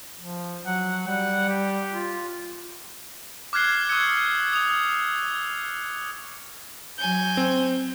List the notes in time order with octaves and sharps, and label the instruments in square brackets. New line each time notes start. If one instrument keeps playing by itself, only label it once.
[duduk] F3
[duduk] F#3 [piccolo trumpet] F#5
[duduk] G3 [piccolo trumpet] F#5
[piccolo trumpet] G4
[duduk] F4
[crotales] D6 F6 F#6 G#6 C7 G7
C#6 D#6 E6 F#6 G#6 C#7
D#6 F7
[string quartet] F#3 G#5 G6
[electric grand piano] C4